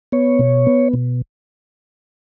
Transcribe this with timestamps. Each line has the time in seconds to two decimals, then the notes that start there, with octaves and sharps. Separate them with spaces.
0.12 B3 C#5
0.39 B2
0.67 B3
0.93 B2